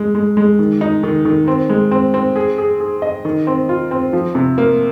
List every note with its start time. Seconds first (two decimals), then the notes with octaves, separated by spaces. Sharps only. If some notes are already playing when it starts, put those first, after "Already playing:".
Already playing: G#3
0.15 G#3
0.37 G#3
0.59 D#3
0.81 D#4
1.03 D#3
1.25 D#3
1.48 C4
1.69 G#3
1.91 C4
2.14 C4
2.36 G#4
2.58 G#4
2.80 G#4
3.02 D#5
3.25 D#3
3.47 C4
3.69 F4
3.91 C4
4.13 F3
4.35 C3
4.58 A#3